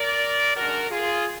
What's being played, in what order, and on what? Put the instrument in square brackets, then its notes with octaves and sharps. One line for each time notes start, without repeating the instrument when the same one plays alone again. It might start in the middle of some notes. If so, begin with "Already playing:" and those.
Already playing: [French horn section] A#4 D5
F#2 D#3 G#3 D4 F#4 A#4
F4 G#4